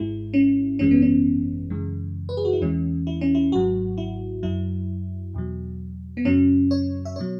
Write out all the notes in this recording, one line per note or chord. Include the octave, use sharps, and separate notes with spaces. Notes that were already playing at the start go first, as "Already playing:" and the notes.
Already playing: G#1 G#2 G#3 E4
C#4
G#1 F#2 E3 G#3 C#4
B3
C#4
F#2 C#3 E3 G#3
B4
G#4
F#4
E4
E2 E3 G#3 C#4
E4
C#4
E4
G#1 G#2 F#3 F#4
E4
F#2 F#3 E4
E2 B2 F#3
B3
F#2 C#3 F#3 C#4
C#5
E5
B2 F#3 C#5